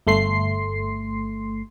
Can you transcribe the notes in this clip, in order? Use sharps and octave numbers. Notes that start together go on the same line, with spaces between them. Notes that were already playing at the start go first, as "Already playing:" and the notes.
G1 A3 C6 C7